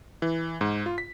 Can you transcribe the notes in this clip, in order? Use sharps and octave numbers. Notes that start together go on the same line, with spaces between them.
E3
G#2
F4
B6